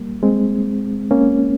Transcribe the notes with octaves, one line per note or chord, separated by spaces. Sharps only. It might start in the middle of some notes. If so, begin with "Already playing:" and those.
Already playing: G3 A#3
G#3 C4
A#3 C#4